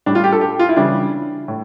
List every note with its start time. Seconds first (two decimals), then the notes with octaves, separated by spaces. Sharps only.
0.06 A2 G3 D4
0.15 F4
0.24 G4
0.32 A4
0.41 G4
0.59 F4
0.69 E4
0.76 C#3 E3 G3 D4
1.48 A2